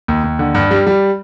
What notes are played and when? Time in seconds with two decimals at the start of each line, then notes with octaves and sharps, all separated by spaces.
0.08 D#2
0.24 D#2
0.39 D3
0.54 G2
0.71 G3
0.87 G3